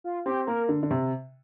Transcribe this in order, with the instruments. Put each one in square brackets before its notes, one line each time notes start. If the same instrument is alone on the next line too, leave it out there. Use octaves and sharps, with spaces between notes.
[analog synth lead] F4
[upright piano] C4 [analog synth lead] G4
[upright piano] A#3 [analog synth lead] A#4
[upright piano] D3
D3
C3